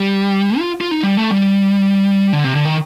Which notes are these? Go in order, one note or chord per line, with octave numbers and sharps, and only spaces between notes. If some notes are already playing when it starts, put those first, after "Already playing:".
Already playing: G3
F4
F4
D#4
G3
A3
G3
D3
C3
D3
D#3